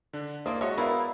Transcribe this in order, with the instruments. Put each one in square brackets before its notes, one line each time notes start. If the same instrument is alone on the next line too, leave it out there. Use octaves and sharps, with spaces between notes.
[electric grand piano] D3 D4
[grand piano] A#3 D5 [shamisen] E4 C5 [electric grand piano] D#6
[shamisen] G#3 C#5 [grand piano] F#4 D#5 [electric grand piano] E5
[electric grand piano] B3 [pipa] E4 [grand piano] A#4 D5 F5